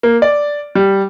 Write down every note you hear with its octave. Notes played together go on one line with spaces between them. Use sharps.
A#3
D5
G3